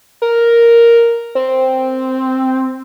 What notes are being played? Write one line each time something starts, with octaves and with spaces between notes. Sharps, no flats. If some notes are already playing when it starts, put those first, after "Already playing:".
A#4
C4